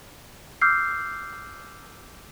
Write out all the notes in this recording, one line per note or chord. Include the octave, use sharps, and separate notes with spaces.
D6 E6 F6 G6 C7